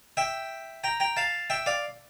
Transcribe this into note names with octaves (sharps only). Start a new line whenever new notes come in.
E5 G5
G5 A#5
G5 A#5
F5 A5
E5 G5
D5 F5